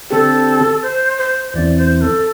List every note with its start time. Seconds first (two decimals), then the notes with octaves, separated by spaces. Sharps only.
0.10 D3 C4 G4 A4
0.82 C5
1.18 C5
1.54 E2 E3 C4 D5
1.78 C5
2.01 A4